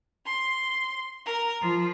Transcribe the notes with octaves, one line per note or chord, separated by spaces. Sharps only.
C6
A#4
F3